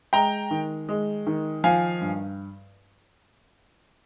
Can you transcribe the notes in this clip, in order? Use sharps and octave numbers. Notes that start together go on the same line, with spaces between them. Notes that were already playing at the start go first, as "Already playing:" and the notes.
G#3 G5 A#5
D#3
G#3
D#3
F3 F5 G#5
G2